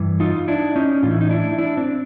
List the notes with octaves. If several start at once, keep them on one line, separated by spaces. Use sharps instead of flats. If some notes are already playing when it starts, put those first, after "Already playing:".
Already playing: G2 E3
D#4 F4
D4 E4
C#4 D#4
A2 E3 F4
E4
D#4
D4 E4
D4 E4
C4 D4